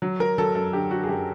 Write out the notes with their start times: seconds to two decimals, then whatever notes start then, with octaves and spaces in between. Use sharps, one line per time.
0.02 F#3
0.20 F#3 A#4
0.38 F#3 A4
0.55 F#2 A4
0.73 D3 G4
0.91 D3 F#4
1.03 G#4
1.09 F#2 G4